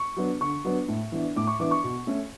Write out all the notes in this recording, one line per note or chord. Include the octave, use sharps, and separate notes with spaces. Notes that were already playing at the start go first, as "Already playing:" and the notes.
Already playing: C#6
F#3 B3 D4
D3 C#6
F#3 B3 D4
A2
E3 B3 D4
A2 D6
C#6
E3 B3 D4 D6
C#6
B2
A3 C#4